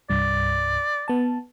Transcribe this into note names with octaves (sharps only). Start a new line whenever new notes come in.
C2 G2 D5
B3 A5